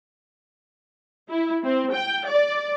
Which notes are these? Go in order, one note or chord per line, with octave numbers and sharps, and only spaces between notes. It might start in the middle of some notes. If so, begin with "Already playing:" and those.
E4
C4
G5
D5